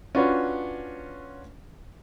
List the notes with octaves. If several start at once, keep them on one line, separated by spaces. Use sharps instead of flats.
C#4 D4 F4 F#4 B4 C#5